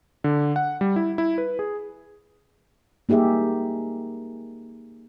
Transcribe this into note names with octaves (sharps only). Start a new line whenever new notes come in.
D3
F#5
G3
E4
E4
B4
G#4
A#3 D#4 G4 G#4 E5